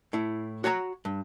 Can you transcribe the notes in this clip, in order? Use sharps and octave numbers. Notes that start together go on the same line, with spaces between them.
A2 E4
F#4 C#5 F#5 G#5 A#5
G2